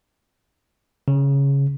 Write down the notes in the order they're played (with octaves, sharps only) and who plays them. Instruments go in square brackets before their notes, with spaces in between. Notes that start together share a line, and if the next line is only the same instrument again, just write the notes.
[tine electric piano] C#3